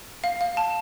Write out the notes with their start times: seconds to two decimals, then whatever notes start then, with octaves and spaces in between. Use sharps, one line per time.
0.24 F5
0.41 F5
0.57 A5